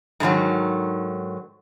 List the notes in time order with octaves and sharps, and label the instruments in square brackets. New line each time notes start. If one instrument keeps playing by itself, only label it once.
[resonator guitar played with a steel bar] G#2 D3 D#3 F#3